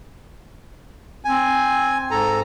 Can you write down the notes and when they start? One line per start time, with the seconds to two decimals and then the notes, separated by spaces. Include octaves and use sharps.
1.25 C4 G#5
2.11 G#2 A4 A#5